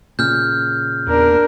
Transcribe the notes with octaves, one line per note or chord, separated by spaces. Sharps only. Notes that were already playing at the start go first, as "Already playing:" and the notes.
A#2 C#3 F6 G6
E2 D4 A#4